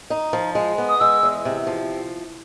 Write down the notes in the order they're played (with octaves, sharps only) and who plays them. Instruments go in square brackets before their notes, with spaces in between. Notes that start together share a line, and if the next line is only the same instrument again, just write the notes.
[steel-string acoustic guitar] D#4
F3
G#3
B3
[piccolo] D#6
[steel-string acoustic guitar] G#3 [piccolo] E6
[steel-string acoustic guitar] E2
C3
F3